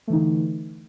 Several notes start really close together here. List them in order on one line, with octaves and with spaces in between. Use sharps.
A3 E3 D#4 D3